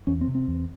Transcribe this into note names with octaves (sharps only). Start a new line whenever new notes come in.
E2 C#4
C4
C3
C4
E2